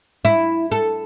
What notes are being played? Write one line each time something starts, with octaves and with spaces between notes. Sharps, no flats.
E4
A4